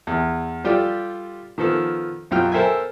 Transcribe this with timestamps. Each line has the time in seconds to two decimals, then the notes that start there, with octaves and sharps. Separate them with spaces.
0.07 E2
0.64 G3 F4 G4 A4 D5
1.58 D#3 F3 B3 A4
2.31 B1 F#2 F#3 F4 G5 F6
2.52 A4 A#4 C5 E5 G5 G#5